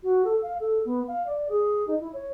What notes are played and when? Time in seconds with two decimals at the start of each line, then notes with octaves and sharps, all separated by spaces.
0.04 F#4
0.25 A4
0.42 F5
0.60 A4
0.85 B3
1.08 F5
1.26 D5
1.49 G#4
1.87 D#4
2.00 E4
2.13 C#5